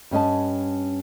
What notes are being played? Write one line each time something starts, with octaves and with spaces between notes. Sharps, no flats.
G2 C#4 D#5 A5